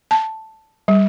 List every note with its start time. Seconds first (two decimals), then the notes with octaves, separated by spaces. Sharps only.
0.11 A5
0.88 G3